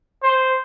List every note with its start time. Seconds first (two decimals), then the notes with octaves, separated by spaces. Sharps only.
0.23 C5